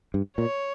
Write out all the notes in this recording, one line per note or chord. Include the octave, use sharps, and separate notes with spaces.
G2
A#2 C#5